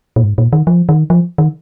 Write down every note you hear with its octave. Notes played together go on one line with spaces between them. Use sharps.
A#2
G#2
A#2
D#3
F3
D#3
F3
D#3